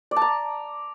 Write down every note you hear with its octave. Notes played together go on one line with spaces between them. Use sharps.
D5
A5
A#5